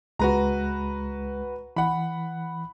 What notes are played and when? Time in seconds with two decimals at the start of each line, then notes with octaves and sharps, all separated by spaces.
0.19 C#2 G#3 F#4 B4 A#5
1.77 E3 F#5 B5